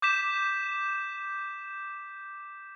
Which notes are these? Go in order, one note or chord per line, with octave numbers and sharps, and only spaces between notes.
D6 G6 B6 E7